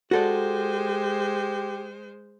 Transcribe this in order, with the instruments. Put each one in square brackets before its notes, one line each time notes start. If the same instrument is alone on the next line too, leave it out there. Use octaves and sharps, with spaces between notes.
[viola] G#3 C5 [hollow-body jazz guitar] F#4 A4 D5 [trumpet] G4